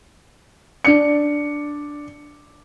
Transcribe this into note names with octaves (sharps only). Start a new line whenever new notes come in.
D4 D5 C#7